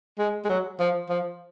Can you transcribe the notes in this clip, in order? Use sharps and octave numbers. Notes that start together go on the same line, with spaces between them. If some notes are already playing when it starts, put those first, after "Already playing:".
G#3
G#3
F#3
F3
F3